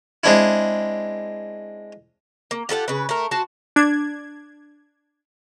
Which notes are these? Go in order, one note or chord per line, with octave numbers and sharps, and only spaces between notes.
G#3 C4 D4 E4
A#3
F4 G4 A4 F#5
C#3 B4
A3 A#4
F#4 C5 A5
D4 G#6